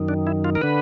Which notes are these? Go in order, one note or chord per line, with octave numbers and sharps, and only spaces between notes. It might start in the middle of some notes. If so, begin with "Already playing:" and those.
Already playing: F#2 D#3
D4
E4
F4
A#4
D3 B4